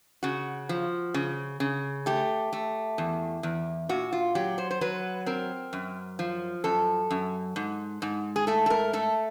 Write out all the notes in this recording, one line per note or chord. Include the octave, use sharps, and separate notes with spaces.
C#3 F#4
F3
C#3
C#3
A3 G4
A3
E2
E2
A#2 F#4
F4
F#3 G4
C5
C5
F#3 B4
C4 A#4
F#2
F3
F#2 A4
F#2
G#2
G#2
G#4
A3 A4
A4
A#4
A3 A4